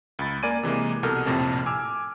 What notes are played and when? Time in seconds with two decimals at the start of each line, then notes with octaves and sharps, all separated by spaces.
0.19 C#2 B5 A6
0.43 A#3 D5 G#5 D6 G#6 D#7
0.63 C3 E3 G#3 A#3
1.03 C2 B2 A4 A#4 F6
1.26 A#1 F2 A2 C3 A#4 A5
1.66 G#5 D6 E6 F6